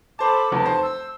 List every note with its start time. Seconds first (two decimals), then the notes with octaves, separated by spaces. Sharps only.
0.19 A4 C5 A5 B5 D6
0.52 F1 E2 A5
0.66 C5
0.83 E6